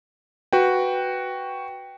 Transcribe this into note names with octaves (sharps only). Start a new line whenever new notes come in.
F#4 B4 G5